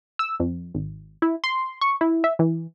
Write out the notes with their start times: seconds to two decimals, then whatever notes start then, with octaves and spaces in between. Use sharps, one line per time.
0.19 E6
0.40 F2
0.74 G#1
1.22 E4
1.44 C6
1.81 C#6
2.01 E4
2.24 E5
2.39 E3